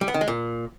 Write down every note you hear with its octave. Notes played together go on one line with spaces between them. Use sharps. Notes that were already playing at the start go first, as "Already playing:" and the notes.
G3
B3
D#3
G#3
A#2